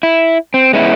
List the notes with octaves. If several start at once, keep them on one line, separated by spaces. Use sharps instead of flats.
E4
C4
G#3 B3 C#4 E4